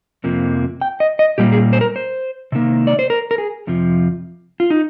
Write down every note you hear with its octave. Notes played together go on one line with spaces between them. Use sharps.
F2 C3 F3 A#3
G5
D#5
D#5
A#2 G3 A#3 G4
G#4
C5
A#4
C5
C3 D#3 A#3
D5
C5
A#4
A#4
G#4
F2 C3 F3
F4
D#4